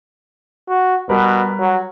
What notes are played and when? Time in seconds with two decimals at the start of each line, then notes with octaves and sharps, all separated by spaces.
0.68 F#4
1.09 B2 G3 A#4 B4
1.59 F#3